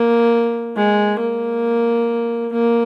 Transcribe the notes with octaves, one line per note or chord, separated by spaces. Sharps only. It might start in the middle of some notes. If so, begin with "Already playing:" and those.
Already playing: A#3
G#3
A#3
A#3